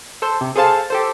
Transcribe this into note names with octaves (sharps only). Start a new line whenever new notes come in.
A4 C5
C3
G#4 A4 C5 F5 A5
G4 A4 C5